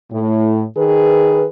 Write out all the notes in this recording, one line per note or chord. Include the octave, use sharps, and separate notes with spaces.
A2
D#3 G#4 B4